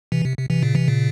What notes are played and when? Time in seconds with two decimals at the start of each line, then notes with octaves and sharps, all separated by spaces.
0.12 C3 E3
0.25 C3
0.38 C3
0.50 C3 E3
0.62 A#2 C#3
0.75 C3 E3
0.88 A#2 C#3